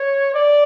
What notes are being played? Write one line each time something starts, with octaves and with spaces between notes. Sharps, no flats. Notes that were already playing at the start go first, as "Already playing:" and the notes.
Already playing: C#5
D5